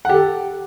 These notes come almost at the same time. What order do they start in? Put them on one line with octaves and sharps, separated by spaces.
F#5 G4 A4